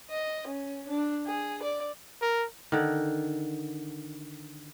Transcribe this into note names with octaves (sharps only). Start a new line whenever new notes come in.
D#5
C#4
D4
G#4
D5
A#4
D3 D#3